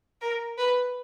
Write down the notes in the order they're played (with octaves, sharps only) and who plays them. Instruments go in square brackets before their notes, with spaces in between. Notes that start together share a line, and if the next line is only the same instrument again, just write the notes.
[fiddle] A#4
B4